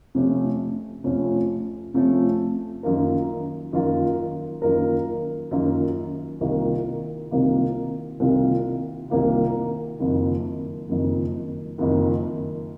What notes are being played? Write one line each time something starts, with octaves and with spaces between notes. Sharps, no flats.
F2 C3 F3 A3 C#4
F2 C3 F3 A3 C#4
F2 C3 F3 A3 C#4
F#2 D#3 A#3 F4 A#4
F#2 D#3 A#3 F4 A#4
F#2 D#3 A#3 F4 A#4
F#2 D#3 A#3 F4 A#4
C2 C3 D#3 A#3 F4
C2 C3 D#3 A#3 F4
C2 C3 D#3 A#3 F4
C2 C3 D#3 A#3 F4
F#1 F2 D#3
F#1 F2 D#3
F#1 F2 D#3